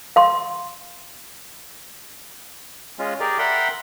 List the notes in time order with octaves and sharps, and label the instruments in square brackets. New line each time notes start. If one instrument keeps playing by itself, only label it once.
[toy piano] F5 C6
[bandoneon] G#3 C#4 F4
G4 G#4 A#4 D5
A#4 E5 F#5 G5 B5 C6